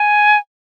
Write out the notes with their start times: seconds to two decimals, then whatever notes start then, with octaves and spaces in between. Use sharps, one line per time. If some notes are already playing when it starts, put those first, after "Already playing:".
Already playing: G#5